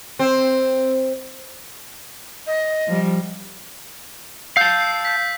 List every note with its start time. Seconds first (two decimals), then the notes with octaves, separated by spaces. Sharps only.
0.19 C4
2.47 D#5
2.87 F3 G3
4.57 F5 A5 E6 G6 C7
5.05 G6 B6